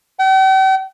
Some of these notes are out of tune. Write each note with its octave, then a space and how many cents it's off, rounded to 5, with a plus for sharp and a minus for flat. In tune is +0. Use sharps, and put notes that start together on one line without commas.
G5 -45